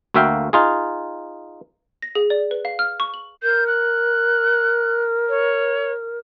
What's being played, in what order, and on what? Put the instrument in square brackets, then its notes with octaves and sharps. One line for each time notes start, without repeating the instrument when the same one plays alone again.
[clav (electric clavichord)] D2 A#3 F#4 E5 F5 G5
D#4 F4 G#4
[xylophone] A#6
G#4
D5
B4
F5
F6
C#6
F#7
[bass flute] A#4 [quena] G6
[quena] F#6
C#5